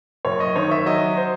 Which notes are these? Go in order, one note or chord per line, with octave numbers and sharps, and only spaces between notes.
F#1 C#5
D#5
D#3 C#5
E5
F#3 D#5
C5